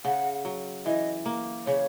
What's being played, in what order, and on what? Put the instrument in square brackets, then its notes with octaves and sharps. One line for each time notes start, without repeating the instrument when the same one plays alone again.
[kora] C#3 [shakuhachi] F#5
[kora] F#3
[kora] E3 [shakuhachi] D#5
[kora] A#3
[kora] C#3 [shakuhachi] C#5